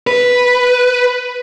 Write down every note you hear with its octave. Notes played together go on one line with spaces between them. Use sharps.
B4